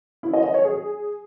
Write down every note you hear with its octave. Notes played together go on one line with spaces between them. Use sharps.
E4
D#5
D#5
C#5
G#4